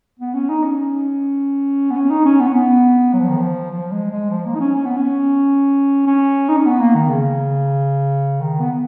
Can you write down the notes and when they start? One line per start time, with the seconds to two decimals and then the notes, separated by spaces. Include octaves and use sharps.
0.19 B3
0.34 C#4
0.49 D#4
0.64 C#4
1.90 B3
1.96 C#4
2.11 D#4
2.25 C#4
2.40 B3
2.47 C#4
2.54 B3
3.13 F#3
3.20 F3
3.29 D#3
3.37 F3
3.72 F3
3.92 G#3
4.11 G#3
4.30 F3
4.46 A#3
4.55 D#4
4.60 C#4
4.75 C#4
4.86 B3
4.97 C#4
6.07 C#4
6.49 D#4
6.57 C#4
6.66 B3
6.80 A#3
6.95 D#3
7.09 C#3
8.41 D#3
8.60 B3